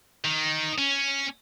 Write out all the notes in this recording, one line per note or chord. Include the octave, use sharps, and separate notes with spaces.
D#3
C#4